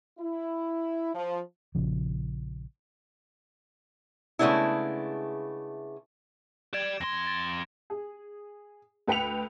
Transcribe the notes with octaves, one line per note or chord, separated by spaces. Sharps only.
E4
F3
A#1 C#3 F3
C#3 G#3 A3 B3 D4 E4
G4 D5 G#6 D7 E7
F2 C6 A#6
A6
G#4
D2 B4 G5 B6 C#7 F7